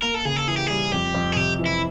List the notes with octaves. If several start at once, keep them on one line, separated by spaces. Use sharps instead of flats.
A#3 A#4
A4
C#3 G#4
A4
E3 G#4
G4
G3 G#4
F2 G4
F2
G#4
C3 G4
E3
E4